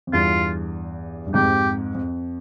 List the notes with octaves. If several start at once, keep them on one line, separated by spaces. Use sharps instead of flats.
F2
E2 G2 F4
G2
F2 G#2 G4
F2